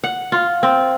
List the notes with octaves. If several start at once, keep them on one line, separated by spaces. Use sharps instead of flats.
F#5
F4
C4